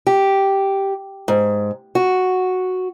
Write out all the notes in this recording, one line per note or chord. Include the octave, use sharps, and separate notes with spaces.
G4
G#2
F#4